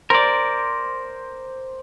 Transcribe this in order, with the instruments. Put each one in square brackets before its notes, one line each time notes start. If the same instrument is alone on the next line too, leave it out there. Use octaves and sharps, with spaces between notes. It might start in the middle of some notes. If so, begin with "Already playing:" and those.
[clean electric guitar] A#4 D5 [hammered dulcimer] C5